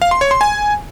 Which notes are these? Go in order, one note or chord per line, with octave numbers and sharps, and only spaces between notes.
F5
C6
C#5
C6
G#5